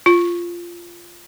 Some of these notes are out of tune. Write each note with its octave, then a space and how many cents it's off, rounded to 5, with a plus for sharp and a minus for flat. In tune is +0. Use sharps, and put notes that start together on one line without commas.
F4 -10